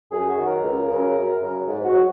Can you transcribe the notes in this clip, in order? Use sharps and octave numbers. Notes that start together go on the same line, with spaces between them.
F#2 G#4
F#4
D#3 F#3
A#4
C#2
C#3 F#3
F#2
C#3 F#3
G#2
F#4
F#3